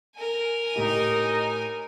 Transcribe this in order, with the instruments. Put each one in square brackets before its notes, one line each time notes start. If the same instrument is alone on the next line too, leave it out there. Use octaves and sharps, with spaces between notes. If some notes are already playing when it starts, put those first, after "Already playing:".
[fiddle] A#4 G#5
[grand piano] A2 G4 [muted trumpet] D#4